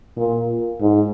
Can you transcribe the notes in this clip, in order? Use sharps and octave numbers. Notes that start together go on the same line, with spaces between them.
A#2
G#2